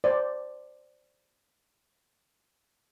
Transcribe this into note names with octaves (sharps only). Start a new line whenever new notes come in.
C5 D5